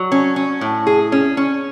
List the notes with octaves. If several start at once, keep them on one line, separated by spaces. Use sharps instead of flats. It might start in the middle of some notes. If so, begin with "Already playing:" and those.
Already playing: F#3
C#4
C#4
A2
G#4
C#4
C#4